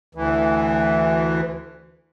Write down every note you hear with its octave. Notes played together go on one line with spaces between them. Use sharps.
D2 E3